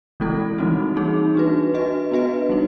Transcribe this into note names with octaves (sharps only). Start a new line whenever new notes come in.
E3 G#3 C4 E4 A4
E3 G3 C4 D#4 F#4
A#3 D#4 G#4
D4 F#4 B4
D4 F#4 B4 D#5
B3 D4 F#4 B4 D#5
G3 A#3 D#4